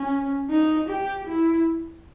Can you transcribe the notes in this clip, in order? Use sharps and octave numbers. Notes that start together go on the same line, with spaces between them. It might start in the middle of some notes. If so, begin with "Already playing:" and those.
Already playing: C#4
D#4
G4
E4